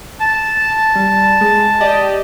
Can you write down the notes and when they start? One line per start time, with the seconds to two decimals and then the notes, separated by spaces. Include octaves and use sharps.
0.20 A5
0.96 G3
1.41 G#3
1.81 G4 D5 D#5